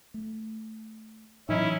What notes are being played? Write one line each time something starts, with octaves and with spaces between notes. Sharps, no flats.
A3
A2 E3 F#3 C#4 D#4 E4